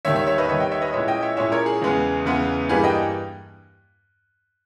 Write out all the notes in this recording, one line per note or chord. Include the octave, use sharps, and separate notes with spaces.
D#2 D#3 G3 C#5 E5
C#5 E5
C#5 E5
B4 D#5
D#2 D#3 G3 C#5 E5
D#5 G5
C#5 E5
B4 D#5
A#2 G#3 C#4 E4 C#5 E5
D#5 G5
C#5 E5
A#2 G#3 C#4 E4 C#5 E5
A#4 C#5
G#4
E2 C#3 G#3 B3
E2 C#3 G#3 B3
G2 E3 G3 A#3 G#4 B4
D#5 G5